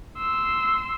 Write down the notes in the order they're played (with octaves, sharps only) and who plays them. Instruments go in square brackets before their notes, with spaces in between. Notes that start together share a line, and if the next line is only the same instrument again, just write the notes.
[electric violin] C6 E6